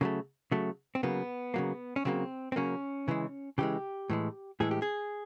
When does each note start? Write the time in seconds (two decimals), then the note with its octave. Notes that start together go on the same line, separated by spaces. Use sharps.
0.01 C#3 F#3 A3 A#3
0.51 C#3 F#3 A3
0.95 C4
1.03 C#3 F#3 A#3 B3
1.54 C#3 F#3 A#3
1.96 C#4
2.05 C#3 F#3 A#3 C4
2.52 C4
2.56 C#3 F#3 A#3 C#4
3.08 C#3 E3 G#3
3.58 C#3 E3 G#3 G4
4.10 A2 E3 G#3
4.60 A2 E3 G#3 G#4
4.71 G4
4.82 G#4